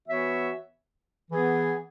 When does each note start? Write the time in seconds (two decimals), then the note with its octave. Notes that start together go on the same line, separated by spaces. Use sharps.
0.07 E3 B3 F#4 C#5 E5
1.31 E3 B3 G#4